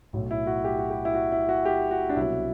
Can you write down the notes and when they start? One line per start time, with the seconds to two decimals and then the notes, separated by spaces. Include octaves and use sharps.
0.13 B1 A2 F#3
0.31 E4
0.47 F#4
0.64 G4
0.79 F#4
0.90 G4
1.05 E4
1.15 F#4
1.32 E4
1.49 F#4
1.65 G4
1.91 F#4
2.09 D4
2.16 C2 B2 F#3 E4